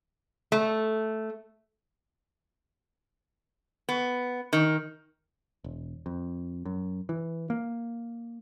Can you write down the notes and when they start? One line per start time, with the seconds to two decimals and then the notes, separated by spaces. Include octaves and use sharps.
0.52 A3
3.89 B3
4.53 D#3
5.64 E1
6.06 F2
6.65 F#2
7.09 E3
7.50 A#3